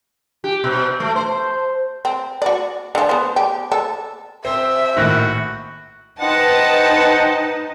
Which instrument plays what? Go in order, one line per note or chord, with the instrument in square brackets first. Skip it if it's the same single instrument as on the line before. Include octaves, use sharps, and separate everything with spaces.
[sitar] G4
B2
A3
C5
[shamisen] C4
F#4 D5
D3 F3
B3 C5
G4
A4
[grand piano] C4 C5 [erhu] E5
[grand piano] A#1 A2 D#3 [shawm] F#4
[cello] D#4 [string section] B4 A5 [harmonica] C5 D#5 G5 [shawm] F#5